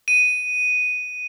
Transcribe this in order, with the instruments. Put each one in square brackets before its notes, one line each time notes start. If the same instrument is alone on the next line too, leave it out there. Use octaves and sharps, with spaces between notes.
[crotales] D#7